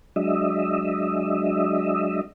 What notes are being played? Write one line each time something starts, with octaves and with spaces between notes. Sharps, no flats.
F#3 G#3 D4 D#5 E5